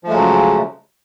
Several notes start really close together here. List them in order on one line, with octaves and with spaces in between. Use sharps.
F3 A3 G#3 F#3 C#3